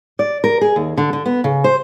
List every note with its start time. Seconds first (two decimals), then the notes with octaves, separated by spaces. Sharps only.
0.19 D5
0.44 A#4
0.61 G#4
0.76 D#2
0.97 D3
1.13 D3
1.26 B3
1.44 C#3
1.64 C5